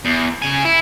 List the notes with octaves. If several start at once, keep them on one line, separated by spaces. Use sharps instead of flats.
E2
C#3 G#5
E4